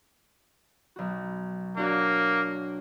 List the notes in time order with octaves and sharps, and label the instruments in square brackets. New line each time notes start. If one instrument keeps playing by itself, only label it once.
[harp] B1 F#4
[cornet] A#3 [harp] D4 F#4 C#5